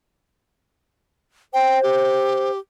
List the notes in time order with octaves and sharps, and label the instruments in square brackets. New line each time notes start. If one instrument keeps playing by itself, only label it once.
[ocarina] C5 [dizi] G5
[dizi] G4